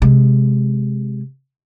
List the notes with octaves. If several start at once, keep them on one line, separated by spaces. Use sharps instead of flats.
C3 G#3